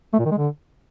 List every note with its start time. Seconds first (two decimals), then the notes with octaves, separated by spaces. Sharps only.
0.13 A3
0.19 A#2
0.25 D#3
0.31 G#3
0.37 D3